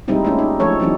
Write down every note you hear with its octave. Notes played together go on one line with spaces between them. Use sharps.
A#2 G3 G#3 C4 D#4 E4
G#3 A3 C#4 D4 E4
D#4
F3 G#3 A3 A4 C#5
E3 F#3 C4 D4 D#4